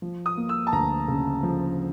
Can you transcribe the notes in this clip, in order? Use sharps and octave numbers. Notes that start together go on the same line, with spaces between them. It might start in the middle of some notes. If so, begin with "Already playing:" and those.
F3
D#6
A#3
E6
A5
D2 A#5
C#3
F3